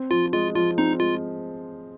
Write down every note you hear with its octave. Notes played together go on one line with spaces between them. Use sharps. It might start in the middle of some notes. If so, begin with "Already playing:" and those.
Already playing: C4
F3 F4
G#3 F4
F3 F4
C4 D#4
G#3 F4